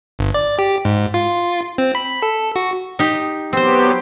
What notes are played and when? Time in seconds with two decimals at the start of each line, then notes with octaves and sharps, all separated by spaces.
0.19 G1
0.34 D5
0.59 G4
0.85 G#2
1.14 F4
1.78 C4
1.95 B5
2.22 A4
2.56 F#4
2.99 D#4 G4
3.53 F#3 B3 C4 G4 C5